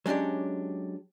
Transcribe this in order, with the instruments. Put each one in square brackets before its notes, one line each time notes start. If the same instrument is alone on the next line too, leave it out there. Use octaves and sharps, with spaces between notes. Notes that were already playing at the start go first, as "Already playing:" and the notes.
[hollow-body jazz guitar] F#3 G#3 C#4 D4 G4